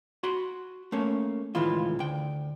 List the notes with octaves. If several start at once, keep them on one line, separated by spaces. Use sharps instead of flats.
F#4 B5 C6
A3 A#3 C#4 C#5
C#2 A2 D#3 E3 F4
D2 G5